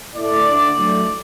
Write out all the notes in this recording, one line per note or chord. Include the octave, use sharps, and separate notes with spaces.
A2 A3 E4 D5
D2 D3 A3
A2 F#3 A3 D4